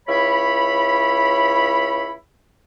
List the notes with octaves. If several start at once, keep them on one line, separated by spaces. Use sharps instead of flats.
C#2 E4 C#5 B5